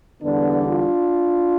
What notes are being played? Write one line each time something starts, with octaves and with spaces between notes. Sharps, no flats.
E2 D3 G3 B3 D4
D4 F4